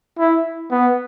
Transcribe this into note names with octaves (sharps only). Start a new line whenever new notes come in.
E4
B3